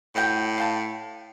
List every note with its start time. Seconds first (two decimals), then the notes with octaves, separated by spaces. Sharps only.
0.15 A2 F3 F#4 G5
0.58 F5 G5 A5